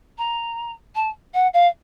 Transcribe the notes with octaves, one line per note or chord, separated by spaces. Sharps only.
A#5
A5
F#5
F5